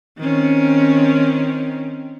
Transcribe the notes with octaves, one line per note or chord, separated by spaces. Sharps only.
D#3 C4 C#4